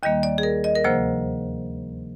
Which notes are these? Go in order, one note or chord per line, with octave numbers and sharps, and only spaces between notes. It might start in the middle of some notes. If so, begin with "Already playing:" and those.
D#2 D#3 G3 A#3 D#5
D5
G#4
A#4
D#5
A#4
D2 C3 F3 A#3 C5